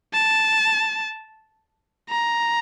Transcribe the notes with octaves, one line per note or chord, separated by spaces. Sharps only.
A5
A#5